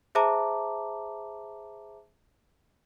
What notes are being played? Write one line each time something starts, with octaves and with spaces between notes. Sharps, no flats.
G#4 C5 E5 A5 A#5 D6